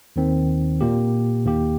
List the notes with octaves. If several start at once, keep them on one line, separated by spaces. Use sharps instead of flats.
D#2 D#3 C4
A#2 A#3 G4
D#2 D#3 A#3 G4